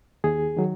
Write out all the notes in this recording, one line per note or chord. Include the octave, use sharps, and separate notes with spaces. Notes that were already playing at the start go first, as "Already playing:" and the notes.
D#2 G#4
D#3 F#3